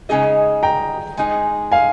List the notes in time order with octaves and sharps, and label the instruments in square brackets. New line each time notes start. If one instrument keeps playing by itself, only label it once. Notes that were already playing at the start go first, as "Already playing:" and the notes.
[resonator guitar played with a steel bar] C#3 G#3 D#4 G#4 D#5
[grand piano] G5 A#5
[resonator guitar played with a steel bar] G#3 D#4 G#4
[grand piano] F5 G#5